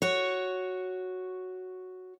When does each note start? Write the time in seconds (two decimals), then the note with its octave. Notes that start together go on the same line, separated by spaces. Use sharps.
0.02 F#4 C#5